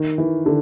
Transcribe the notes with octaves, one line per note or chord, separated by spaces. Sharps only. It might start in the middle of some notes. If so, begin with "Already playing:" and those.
Already playing: D#3
E3
D3